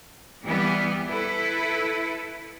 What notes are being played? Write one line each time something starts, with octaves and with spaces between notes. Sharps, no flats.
E3 G3 B3
E4 A4 B4